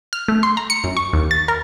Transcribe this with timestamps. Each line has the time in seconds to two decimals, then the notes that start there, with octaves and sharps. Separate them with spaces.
0.13 F6
0.28 A3
0.43 C6
0.57 A#5
0.70 C#7
0.84 F#2
0.97 C#6
1.13 D#2
1.31 A6
1.48 A#4